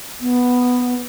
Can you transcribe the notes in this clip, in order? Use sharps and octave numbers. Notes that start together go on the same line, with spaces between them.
B3